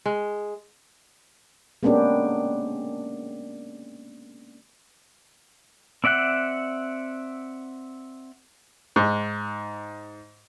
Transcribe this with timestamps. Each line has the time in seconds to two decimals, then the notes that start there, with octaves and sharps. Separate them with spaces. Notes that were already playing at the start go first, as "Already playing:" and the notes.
0.06 G#3
1.83 G#3 A#3 B3 C#4 D4 G4
6.04 C4 D5 E5 F#5 F#6
8.96 G#2